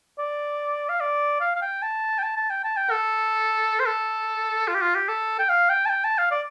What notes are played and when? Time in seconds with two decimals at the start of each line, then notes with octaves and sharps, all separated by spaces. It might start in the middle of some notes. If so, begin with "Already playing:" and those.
0.18 D5
0.89 F5
1.00 D5
1.41 F5
1.56 F5
1.62 G5
1.82 A5
2.18 G5
2.23 A5
2.37 A5
2.50 G5
2.64 A5
2.77 G5
2.91 A4
3.80 C5
3.86 A4
4.68 F4
4.75 G4
4.81 F4
4.95 G4
5.09 A4
5.39 G5
5.49 F5
5.69 G5
5.86 A5
5.90 G5
6.04 A5
6.18 F5
6.31 D5